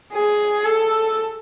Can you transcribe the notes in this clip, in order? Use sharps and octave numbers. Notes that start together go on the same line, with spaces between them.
G#4
A4